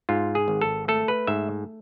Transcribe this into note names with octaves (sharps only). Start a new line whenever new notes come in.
G#2 F4
G#4
G#1
A4
A3 A4
B4
G#2 E5